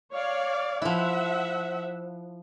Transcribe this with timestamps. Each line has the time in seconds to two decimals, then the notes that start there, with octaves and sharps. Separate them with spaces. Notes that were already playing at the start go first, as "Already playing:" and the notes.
0.11 C#5 D5 F5
0.82 F3 E4 E5 F#5